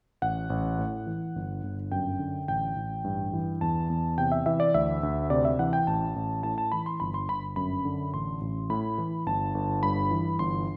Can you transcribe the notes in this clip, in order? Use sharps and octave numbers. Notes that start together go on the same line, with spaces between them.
A1 F#5
A1
A2
E3
G1
G1
F#2 G5
D3
A1 G5
A1
G2
E3
E2 A5
E2
C3 G5
E5
E3 E5
D5
D2 E5
D2
C3 D5
E5
E3 F#5
G5
A1 A5
A1
A2 A5
A5
E3 B5
C6
G1 B5
C6
G1 B5
F#2 B5
D3
A1 C6
A1
A2 B5
E3
G1 A5
G1
G2 B5
E3
G1 C6